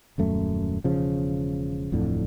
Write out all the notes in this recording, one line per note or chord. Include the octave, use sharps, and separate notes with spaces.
D#1 F#2 A3
E1 C#3 F3
D1 F2 A2 D3